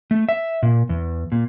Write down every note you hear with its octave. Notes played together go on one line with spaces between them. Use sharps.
A3
E5
A#2
E2
A#2